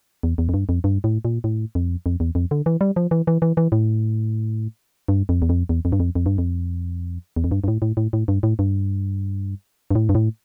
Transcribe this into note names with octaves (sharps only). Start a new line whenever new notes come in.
E2
E2
F2
G2
F2
G2
A2
A#2
A2
F2
F2
E2
F2
D3
E3
G3
F3
E3
E3
E3
E3
A2
G2
F2
E2
F2
E2
F2
G2
F2
F2
G2
F2
E2
F2
G2
G2
A2
A2
A2
A2
G2
A2
G2
G2
A2
G2
A2